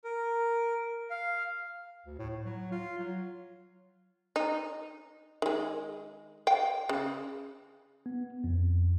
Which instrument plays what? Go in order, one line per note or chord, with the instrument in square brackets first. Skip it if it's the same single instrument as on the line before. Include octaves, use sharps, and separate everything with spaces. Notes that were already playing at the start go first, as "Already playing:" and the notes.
[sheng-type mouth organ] A#4
F5
[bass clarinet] D2
A2
A2
F#3
F4
F#3
[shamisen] D#4
D#3 G#3
F5 G5
C#3
[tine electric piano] B3
F2